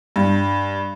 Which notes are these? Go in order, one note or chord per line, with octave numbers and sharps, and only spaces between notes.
G2